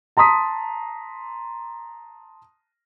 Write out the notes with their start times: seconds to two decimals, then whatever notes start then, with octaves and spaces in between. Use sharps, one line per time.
0.17 A5 A#5 C6 D#6 B6